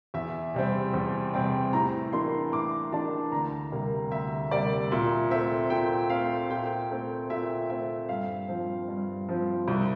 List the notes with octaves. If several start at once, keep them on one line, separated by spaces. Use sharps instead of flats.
E2 E5
C3 G3 C4
E2
C3 G3 C4
A2 A#5
E3 A#3 D4 C6
A2 D6
E3 A#3 D4 A5
D2 A#5
C3 G3 A#3
D2 E5
C3 G3 A#3 D5
A#2 E5
A3 C4 E5
A#2 G5
C4 F5
A3
A#2 G5
A3 C4
A#2 E5
A3 C4 E5
G2 F5
F3 C4
G2
F3 C4
C2